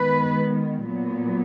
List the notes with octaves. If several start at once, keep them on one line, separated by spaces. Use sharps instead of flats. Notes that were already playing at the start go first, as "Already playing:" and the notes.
Already playing: D#3 G#3 B3 B4
A#2 F#3 B3